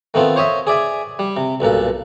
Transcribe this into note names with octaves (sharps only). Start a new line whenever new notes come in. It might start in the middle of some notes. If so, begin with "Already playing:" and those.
D#3 A3 B3 C4 F4
C5 C#5 D#5 E5
G#4 D5 E5 G#5
G3
C3
B1 G2 A#2 A4